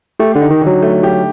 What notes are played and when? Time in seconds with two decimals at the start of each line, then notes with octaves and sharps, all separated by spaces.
0.19 A3 G4
0.35 D3
0.41 D#4
0.50 D#3
0.62 D3 F#3
0.82 A3
1.03 G4